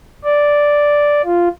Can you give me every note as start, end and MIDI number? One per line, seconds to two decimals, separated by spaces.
0.24 1.22 74
1.25 1.49 65